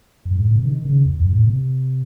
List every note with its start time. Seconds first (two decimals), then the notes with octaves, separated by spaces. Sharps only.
0.25 F#2
0.35 G#2
0.45 A2
0.55 C3
0.65 D#3
0.85 C#3
1.05 E2
1.19 F#2
1.32 A2
1.46 C3